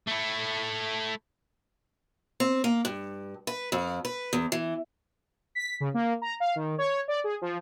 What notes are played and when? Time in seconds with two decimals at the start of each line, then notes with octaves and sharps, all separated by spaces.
0.08 A3 E4
2.40 C4
2.64 A#3
2.85 G2
3.47 B4
3.72 F2
4.05 B4
4.33 E2
4.52 E3
5.55 B6
5.80 C#3
5.94 A#3
6.22 A#5
6.40 F5
6.56 D#3
6.78 C#5
7.08 D5
7.24 G#4
7.42 F3